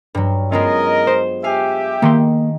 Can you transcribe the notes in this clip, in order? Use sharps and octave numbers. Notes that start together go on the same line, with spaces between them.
G2 F#3
G#3 B3 C#4 F4 A#4 D#5
C5
G4 E5 F5 G#5
D#3 A#3 B5 C6